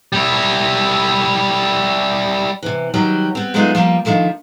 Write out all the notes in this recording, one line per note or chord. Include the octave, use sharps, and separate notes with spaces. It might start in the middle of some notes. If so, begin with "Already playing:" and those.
G3 E4
C3 E3
D#3 F#3 G3 F#4 G4
B3 C4
F#3 G#3 A3 B3 D#4 F4
F3 G3 A#3 G4
D3 D#3 F3 A3 A#3